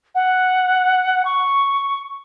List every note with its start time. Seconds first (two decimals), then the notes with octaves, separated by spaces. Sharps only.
0.15 F#5
1.25 C#6